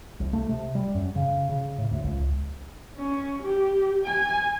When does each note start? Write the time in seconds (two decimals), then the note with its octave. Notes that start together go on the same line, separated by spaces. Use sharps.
0.20 C2
0.33 A3
0.49 C3
0.75 G3
0.95 F#2
1.16 C#3
1.49 C#3
1.78 A2
1.91 D2
2.04 C#2
2.97 C#4
3.43 G4
4.05 G#5